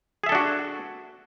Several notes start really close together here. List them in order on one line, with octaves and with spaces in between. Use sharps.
G#4 E5 A4 D4 F#4